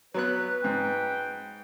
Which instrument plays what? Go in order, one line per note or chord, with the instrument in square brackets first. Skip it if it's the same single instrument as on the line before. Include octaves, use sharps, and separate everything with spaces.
[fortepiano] F#3 B3 F#6 [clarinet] B4
[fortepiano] G#2 [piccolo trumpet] G5